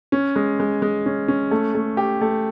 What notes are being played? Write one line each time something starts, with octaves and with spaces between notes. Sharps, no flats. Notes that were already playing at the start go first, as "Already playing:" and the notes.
C#4
G#3
G#3
G#3
C#4
C#4
A3
A3
G4
A3